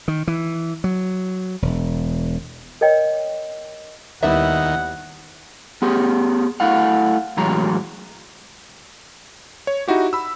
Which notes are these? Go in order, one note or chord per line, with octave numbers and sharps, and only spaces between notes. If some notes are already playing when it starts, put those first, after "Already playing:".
D#3
E3
F#3
E1
A#4 C#5 D#5 G5
D#2 D#3 G3 B3 E4 E5 F#5
B3 G4 G#4
A3 E4 F5 F#5
A2 E3 F#3 G#3 A#5
C#5
D#4 E4 F#4 G4
B5 E6